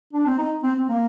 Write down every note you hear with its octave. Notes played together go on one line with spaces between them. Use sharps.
D4
C4
D#4
C4
C4
A#3